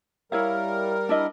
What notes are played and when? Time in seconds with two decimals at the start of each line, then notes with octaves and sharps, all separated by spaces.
0.32 G3 E4 A#4 C#5 F5
1.09 D4 E4 D#5